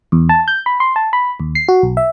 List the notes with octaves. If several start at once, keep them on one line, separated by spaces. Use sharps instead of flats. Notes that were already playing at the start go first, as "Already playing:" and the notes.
E2
A5
G6
B5
C6
A5
B5
D#2
C7
F#4
B1
E5